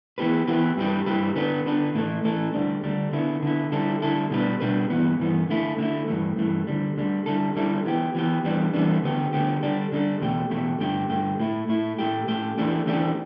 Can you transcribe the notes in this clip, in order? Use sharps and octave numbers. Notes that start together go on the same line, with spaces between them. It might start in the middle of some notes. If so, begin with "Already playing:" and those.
E3 B3 E4 G4 B4
E3 B3 E4 G4 B4
G2 G3 E4 G4 B4
G2 G3 E4 G4 B4
D3 B3 D4 B4
D3 B3 D4 B4
A2 E3 A3 E4 A4
A2 E3 A3 E4 A4
D2 D3 G3 D4
D2 D3 G3 D4
D3 B3 E4
D3 B3 E4
D3 G3 E4 A4
D3 G3 E4 A4
B2 G3 D4 B4
B2 G3 D4 B4
G2 E3 B3
G2 E3 B3
D3 A3 E4
D3 A3 E4
G2 E3 A3
G2 E3 A3
D2 D3 G3
D2 D3 G3
D3 G3 E4 A4
D3 G3 E4 A4
E3 B3 G4
E3 B3 G4
E2 E3 G3 B3 D4
E2 E3 G3 B3 D4
D2 D3 B3 G4
D2 D3 B3 G4
D3 G3 D4 A4
D3 G3 D4 A4
E2 B2 A3 G4
E2 B2 A3 G4
G2 D3 A3 G4
G2 D3 A3 G4
A2 A3 E4
A2 A3 E4
A2 A3 G4
A2 A3 G4
E2 E3 A3 D4 G4
E2 E3 A3 D4 G4